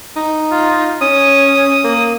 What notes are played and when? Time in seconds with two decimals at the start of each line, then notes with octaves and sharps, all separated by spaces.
0.16 D#4
0.51 F4
1.01 C#4 D#6
1.84 A#3